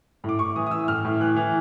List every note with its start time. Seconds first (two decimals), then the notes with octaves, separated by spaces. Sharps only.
0.24 A2
0.29 D6
0.39 A2 C#6
0.56 E3 D#6
0.66 D#6
0.71 E3 E6
0.88 A2 F6
1.04 A2
1.20 E3 F#6
1.36 E3